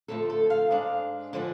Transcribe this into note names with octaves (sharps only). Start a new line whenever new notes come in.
F2 D3 F3 A3 A4
A4
F5
G#2 G#3 D4 F5
D3 F3 G#3 B3